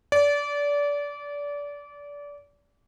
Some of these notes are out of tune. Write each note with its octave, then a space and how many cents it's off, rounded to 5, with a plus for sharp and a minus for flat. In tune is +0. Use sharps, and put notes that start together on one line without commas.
D5 -25